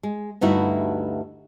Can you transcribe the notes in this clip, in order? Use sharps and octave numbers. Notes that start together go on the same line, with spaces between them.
G#3
D2 G2 D#4 E4 F#4